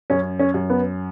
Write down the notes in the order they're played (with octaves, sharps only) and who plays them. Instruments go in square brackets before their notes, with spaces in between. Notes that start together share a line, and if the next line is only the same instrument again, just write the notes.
[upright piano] F#2 [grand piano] C#4
[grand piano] C#4
[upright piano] F#2
[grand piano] B3